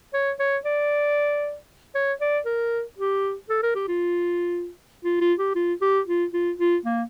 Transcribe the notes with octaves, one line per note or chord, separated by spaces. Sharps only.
C#5
C#5
D5
C#5
D5
A#4
G4
A4
A#4
G4
F4
F4
F4
G4
F4
G4
F4
F4
F4
A#3